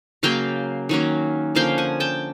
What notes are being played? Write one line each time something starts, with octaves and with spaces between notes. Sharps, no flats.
C#3 F#3 A#3 F5 G5
D#3 F#3 A#3 C#4
D3 F3 A#3 C#4 F5 G5
F#5 G#5
G5 A5